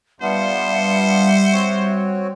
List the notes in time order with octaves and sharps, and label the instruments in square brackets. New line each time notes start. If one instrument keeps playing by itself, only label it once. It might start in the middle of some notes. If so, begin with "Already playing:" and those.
[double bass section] G3 [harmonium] B3 D4 F4 [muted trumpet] C5 [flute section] E5 F#5
[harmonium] C4 F#4 C#5